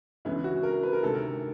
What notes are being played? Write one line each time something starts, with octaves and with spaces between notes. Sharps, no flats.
D2 C#3 E3 G#3 B3 E4
F#4
A#4
B4
A#4
D2 C3 D#3 G#3 A4
A#4